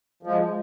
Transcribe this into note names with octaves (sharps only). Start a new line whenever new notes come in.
F3 G#3